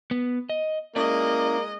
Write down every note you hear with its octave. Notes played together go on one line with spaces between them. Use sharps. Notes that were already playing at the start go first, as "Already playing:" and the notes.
B3
D#5
G#3 A#3 C#4 E4 D5 D#5